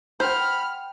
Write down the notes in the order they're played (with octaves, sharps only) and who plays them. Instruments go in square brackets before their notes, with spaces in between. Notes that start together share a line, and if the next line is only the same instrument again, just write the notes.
[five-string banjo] C5 [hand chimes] F#5 G5 [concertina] B5 [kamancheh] F6